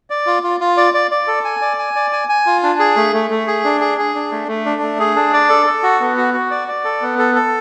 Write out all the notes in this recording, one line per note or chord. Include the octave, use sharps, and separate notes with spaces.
D5
F4
F4
F4
D5
D5
D5
A4
G#5
D5
G#5
D5
G#5
G#5
F4
D4
G#4
A3
A3
A3
G#4
D4
G#4
G#4
D4
A3
A3
D4
A3
G#4
D4
D5
A4
A4
F#4
B3
F#4
F#4
D5
D5
A4
B3
A4
A4